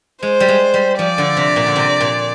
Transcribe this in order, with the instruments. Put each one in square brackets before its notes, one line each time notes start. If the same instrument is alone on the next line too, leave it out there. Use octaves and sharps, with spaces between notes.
[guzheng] G#3 [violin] C5
[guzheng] G3
G#3
G3
[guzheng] F3 [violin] D5
[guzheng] D3
C3
A#2
D3
C3
A#2